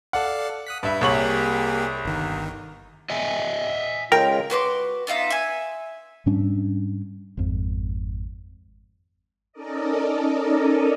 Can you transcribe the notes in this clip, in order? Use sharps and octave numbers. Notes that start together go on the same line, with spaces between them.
A4 D5 F5 F#5
D#6 F#6 B6
G2 B4 E5
C2 A#3 G4 G#4 C#5 F#7
G1 D#3
D#5 E5 G#5
C#3 G#3 F4 A#4 G5
F#4 B4 C6 D6
B3 D#4 F4 E5
E5 G#5
G#2 G3 C#4 D4
G#1 F2
C#4 D#4 A4 A#4 D5 D#5